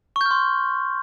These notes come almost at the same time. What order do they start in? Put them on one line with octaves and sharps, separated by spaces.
C#6 G6 F6 C6